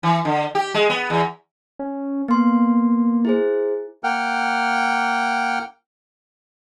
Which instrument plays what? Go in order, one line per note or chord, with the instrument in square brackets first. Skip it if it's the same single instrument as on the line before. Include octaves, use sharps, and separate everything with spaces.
[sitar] E3
D3
G4
G#3
B3
E2
[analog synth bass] C#4
[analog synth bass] A#3 [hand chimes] B3 C6
[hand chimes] E4 G#4 C5
[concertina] A#3 F#5 G5 F6